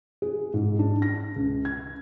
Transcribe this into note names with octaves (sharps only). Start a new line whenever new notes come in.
G#4
G#2
D4
A#6
C#2
G#6